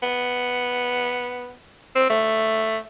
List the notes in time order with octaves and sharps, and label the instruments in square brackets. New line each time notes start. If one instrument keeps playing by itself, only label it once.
[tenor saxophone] B3
C4
A3